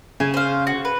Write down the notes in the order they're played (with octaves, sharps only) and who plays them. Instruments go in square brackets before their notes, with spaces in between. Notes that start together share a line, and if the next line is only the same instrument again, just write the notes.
[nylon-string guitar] C#3 [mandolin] G#5
[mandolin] C5 F5
F#4
B4